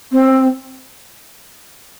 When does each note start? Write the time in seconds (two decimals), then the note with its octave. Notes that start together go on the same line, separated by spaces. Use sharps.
0.12 C4